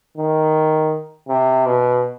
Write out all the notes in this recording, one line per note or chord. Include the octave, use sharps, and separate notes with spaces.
D#3
C3
B2